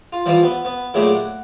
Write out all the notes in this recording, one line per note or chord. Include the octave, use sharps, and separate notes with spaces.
F4
E3 F3 G3 E4 F4
B3
B3
A#2 F#3 A3 E4 G4 G#4
F#5